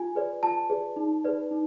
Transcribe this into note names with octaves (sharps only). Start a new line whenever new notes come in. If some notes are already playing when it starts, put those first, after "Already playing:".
Already playing: F4 G#5
G#4 B4 D5
F4 A5
G#4 B4 D5
D#4
G#4 B4 D5
D#4